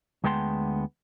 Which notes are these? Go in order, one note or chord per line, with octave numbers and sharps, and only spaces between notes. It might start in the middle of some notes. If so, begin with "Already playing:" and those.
D2 G#3 B3 G5 A5 C6